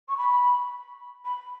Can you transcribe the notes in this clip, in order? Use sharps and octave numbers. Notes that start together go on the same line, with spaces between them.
C#6
B5
B5